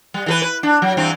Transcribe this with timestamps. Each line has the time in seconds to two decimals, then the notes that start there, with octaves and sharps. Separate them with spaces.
0.14 G3
0.26 E3 G#4 B4
0.42 B4
0.63 D4
0.82 F#3
0.97 G2 E3 C4